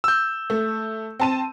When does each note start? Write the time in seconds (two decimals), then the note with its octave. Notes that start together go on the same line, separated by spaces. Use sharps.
0.04 E6 G6
0.50 A3
1.20 C4 A5 D#7